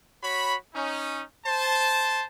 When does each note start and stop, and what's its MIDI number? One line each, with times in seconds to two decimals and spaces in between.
0.23 0.55 66
0.23 0.55 73
0.23 0.55 83
0.74 1.22 61
0.74 1.22 63
1.46 2.24 72
1.46 2.24 81